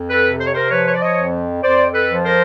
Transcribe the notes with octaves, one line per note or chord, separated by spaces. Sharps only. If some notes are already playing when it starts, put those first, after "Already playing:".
Already playing: F2
A4 B4
C3
C5
C#5
A#4 C5
F3 B4 C#5
C#5
D5
C#5 D#5
F2
F2 C5 D5
A4 B4
F3
A#4 C5